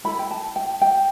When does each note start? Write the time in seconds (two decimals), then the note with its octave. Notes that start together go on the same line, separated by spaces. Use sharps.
0.04 E4 A4 B5
0.19 G5
0.31 A5
0.56 G5
0.82 G5